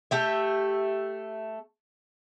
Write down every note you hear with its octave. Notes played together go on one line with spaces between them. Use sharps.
A3 G4 E5